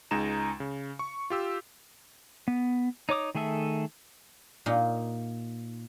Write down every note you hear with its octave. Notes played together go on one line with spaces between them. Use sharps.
C#2 G#3 D#4 A#5 E7
C#3
C#6
F4 G4 E6
B3
D#4 C#5 D6 D#6
D#3 A3 G#4 A4 E5
A#2 D#4